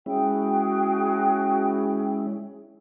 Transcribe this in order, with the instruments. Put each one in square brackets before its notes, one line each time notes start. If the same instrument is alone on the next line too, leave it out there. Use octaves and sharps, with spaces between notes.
[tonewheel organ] G#3 C#4 E4 [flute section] F#4 G#4 G5